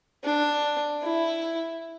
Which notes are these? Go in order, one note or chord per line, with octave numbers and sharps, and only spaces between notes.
D4
E4